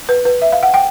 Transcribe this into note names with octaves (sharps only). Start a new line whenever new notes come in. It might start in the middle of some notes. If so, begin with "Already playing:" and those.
B4
B4
E5
F5
F#5
G5